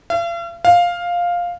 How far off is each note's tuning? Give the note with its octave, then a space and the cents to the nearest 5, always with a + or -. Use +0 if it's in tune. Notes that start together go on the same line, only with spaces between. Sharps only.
F5 -45
F5 +5